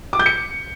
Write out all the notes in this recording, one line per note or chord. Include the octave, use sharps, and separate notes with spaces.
D6
G6
C#7